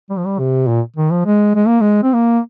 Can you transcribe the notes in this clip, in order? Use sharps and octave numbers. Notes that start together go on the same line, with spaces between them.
G3
F3
G3
C3
A#2
D#3
F3
G#3
G#3
A#3
G#3
C4
A#3